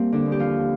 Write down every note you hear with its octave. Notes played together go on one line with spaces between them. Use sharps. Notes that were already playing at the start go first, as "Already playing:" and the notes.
Already playing: G3 A#3 C4 G4
D3 D4
D#2
G4
F3 F4